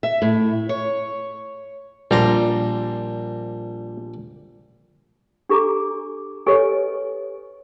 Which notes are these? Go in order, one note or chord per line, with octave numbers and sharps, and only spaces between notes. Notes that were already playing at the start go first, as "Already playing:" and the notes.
E5
A2
C#5
A#1 G3 A#5 C6
D4 G4 A4 G#5 A#5 D6
G4 A4 B4 C#5 D#5 G#5